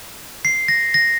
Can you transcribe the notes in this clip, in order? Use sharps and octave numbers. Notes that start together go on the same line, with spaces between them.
C7
A#6
A#6